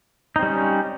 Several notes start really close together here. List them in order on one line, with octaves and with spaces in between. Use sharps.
D#4 C4 G3 C#4